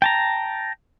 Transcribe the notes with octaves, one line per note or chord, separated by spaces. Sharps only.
G5 A5 A#5